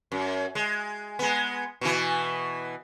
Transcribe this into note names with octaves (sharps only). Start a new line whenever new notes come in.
F#2
G#3
G#3 B3
B2 E3